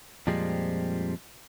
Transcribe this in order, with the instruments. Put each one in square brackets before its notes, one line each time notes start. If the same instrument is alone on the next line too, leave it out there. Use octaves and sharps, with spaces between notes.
[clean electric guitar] F2 A#2 F3 G3 G#3 C4